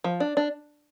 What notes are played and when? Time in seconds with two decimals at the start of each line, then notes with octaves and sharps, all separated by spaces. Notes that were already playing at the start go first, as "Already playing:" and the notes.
0.04 F3
0.20 D4
0.37 D4